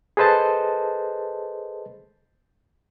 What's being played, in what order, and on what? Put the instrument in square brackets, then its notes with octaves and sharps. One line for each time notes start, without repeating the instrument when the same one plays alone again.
[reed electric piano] G#4 A4 B4 C5 D#5 A5